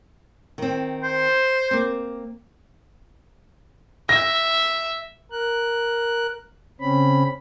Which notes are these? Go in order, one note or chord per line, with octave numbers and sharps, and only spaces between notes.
D#3 C4
C5
A#3 C4
E5 A#6
A#4 F#6
C#3 C4 C#4 B5